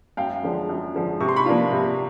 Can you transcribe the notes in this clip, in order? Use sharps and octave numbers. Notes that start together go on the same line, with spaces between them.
F#2 F5 G5
D3 F3 G#3
F#2
D3 F3 G#3
C3 C#6
C6
B5 C#6
F3 A#3 D4 F4
C3